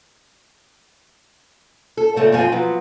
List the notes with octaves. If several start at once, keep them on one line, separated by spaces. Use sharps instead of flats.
A4
A#2 C#3 A3 C4
F#2 B2 F3 C4 F4 G#5
F3 F#3 B3